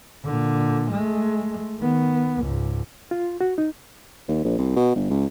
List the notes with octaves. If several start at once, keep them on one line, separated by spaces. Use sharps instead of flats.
A#2 D3
G#3 A3
D#3 B3
C#2 G#2
F4
F#4
D#4
D#2
A#1
C2
B2
G1
C#2